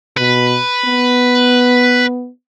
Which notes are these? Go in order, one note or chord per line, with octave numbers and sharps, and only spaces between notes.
B2 B4
B3